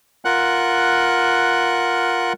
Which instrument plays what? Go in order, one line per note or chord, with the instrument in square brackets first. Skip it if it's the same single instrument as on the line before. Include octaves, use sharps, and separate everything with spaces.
[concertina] F4 A#4 F#5 F#6